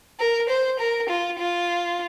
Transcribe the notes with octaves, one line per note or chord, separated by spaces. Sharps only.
A#4
C5
A#4
F4
F4